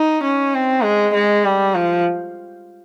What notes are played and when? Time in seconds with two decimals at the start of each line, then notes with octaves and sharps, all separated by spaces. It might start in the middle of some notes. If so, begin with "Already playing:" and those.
Already playing: D#4
0.23 C#4
0.54 C4
0.84 G#3
1.14 G#3
1.45 G3
1.75 F3